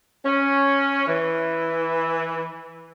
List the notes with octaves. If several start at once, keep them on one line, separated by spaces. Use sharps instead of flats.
C#4
E3